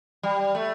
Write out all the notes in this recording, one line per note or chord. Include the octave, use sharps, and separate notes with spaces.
G3
A3